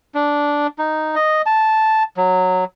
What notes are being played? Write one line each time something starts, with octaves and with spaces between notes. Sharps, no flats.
D4
D#4
D#5
A5
F#3